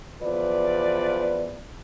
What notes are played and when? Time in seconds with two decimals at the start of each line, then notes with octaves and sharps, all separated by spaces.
0.23 E2 F3 B4 D5